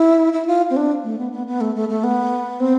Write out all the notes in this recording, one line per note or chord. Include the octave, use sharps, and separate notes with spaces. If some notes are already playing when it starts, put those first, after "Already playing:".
Already playing: E4
E4
F4
C4
D4
A3
B3
B3
B3
A3
A3
A3
B3
C4